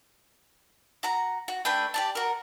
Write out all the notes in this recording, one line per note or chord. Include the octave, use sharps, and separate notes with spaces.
F#4 A#5
F#4
A3 D4 B4 G5
G4 D5 A5
F#4 A#4